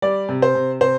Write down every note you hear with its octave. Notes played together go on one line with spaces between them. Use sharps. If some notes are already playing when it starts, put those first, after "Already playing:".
G3 D5
C3
C5
C3
C3 C5